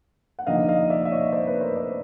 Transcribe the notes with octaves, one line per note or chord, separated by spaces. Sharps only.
F#5
D3 F3 A#3 D#4 D#5 F5
D#5 F5
D5 E5
E5
C#5 D#5
C5 D5
B4 C#5
A#4 C5
C5 D5